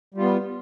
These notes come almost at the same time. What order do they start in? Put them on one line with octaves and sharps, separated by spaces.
G3 F4 B3